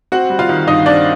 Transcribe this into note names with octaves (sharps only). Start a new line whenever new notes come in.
C4 F#4 F#5
G3
F4 F5
D#3
G2 D#4 D#5
C4 D4 D5